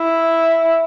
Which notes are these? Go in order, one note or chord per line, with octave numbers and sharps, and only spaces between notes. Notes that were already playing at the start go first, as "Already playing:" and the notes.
Already playing: E4